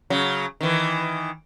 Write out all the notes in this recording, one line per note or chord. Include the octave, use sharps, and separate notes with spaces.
C#3 F#3
D#3 E3